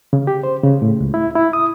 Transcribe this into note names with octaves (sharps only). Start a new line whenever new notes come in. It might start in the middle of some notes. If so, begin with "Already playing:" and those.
C#3
G4
C5
C#3
A2
C#2
E4
E4
D#6